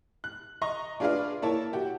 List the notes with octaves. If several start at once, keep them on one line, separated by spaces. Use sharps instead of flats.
F#6
D#5 A#5 C#6
D4 F4 G#4 B4 D5 F5
A#3 E4 C#5 A5
F#4 G4